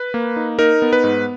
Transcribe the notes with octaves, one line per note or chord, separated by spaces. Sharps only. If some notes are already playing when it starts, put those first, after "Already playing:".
Already playing: B4
A#3
D#4
D#4 A#4
B3
B4
G#2